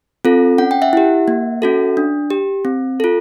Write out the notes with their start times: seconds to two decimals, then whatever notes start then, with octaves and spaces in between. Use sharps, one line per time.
0.25 C4 F4 A4
0.58 C#4 F#5
0.71 G5
0.82 E5 F#5
0.93 E4 G4
1.28 A#3
1.62 C#4 F#4 A4
1.97 D4
2.30 G4
2.65 C4
3.00 F4 A4